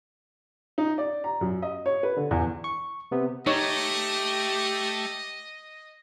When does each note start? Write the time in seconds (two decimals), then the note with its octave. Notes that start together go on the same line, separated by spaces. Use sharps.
0.78 D#4
0.98 D5
1.24 A#5
1.41 F#2
1.62 D#5
1.86 C#5
2.03 B4
2.16 D3
2.31 E2
2.64 C#6
3.12 C3 B3
3.47 A3 D#4 G4 C#5 D#5